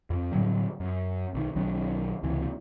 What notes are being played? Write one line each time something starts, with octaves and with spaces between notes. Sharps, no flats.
F2
A2 D3 F#3 G3
F#2
B1 D#3
B1 D#3 F#3 D4
C#2 C3 E3